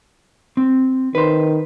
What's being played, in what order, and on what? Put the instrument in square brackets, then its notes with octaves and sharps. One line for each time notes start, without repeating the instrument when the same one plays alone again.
[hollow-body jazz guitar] C4
[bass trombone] D#3 [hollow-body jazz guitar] B4 C5